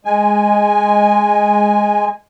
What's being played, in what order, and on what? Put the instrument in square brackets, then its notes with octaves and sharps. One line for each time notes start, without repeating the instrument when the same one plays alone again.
[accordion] G#3 G#5